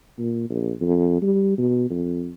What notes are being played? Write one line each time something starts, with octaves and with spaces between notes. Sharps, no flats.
A#2
A#1
F2
G3
B2
F2